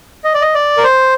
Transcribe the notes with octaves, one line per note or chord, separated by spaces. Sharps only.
D#5
D5
D#5
D5
A#4
C5